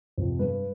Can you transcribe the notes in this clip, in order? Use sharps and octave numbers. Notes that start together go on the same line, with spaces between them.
F2 C3 F3
G2 B4